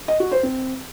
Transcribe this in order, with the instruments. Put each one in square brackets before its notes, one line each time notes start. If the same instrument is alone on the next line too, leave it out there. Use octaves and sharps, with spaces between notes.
[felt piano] D#5
F#4
C5
C4